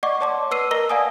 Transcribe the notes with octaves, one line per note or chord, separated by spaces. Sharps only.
D5 D#5 F#5 C#6 D6
C#5 D5 A5 C6 D6
B4 E6 C7 D#7
A#4 D#5 A#5 E6 A#6 G7
D5 F5 F#5 G#5 A5 D#6